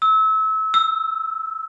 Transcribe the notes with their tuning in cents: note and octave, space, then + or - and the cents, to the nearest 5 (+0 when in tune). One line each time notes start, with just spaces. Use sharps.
E6 -30
E6 +5